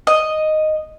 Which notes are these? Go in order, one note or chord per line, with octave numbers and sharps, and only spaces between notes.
D#5